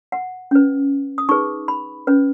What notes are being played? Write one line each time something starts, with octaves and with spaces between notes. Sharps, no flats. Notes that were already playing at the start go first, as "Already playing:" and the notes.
F#5
C#4 B4
D#6
D#4 G#4 B4 C#6
B5
C#4 B4